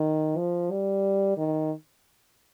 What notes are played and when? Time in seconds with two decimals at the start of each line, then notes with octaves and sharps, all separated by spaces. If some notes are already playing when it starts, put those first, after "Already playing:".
Already playing: D#3
0.37 F3
0.71 G3
1.37 D#3